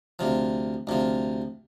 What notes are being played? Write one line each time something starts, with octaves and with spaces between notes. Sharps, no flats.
D2 C3 F3
D2 C3 F3